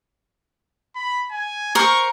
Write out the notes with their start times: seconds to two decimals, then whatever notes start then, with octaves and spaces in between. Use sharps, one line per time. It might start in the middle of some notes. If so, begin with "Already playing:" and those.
0.95 B5
1.31 G#5
1.75 A#4 C5 C#6